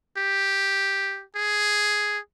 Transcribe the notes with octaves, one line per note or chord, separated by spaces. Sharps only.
G4
G#4